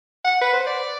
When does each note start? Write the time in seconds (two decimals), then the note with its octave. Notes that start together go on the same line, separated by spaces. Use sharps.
0.24 F#5
0.41 B4
0.53 C5
0.66 D5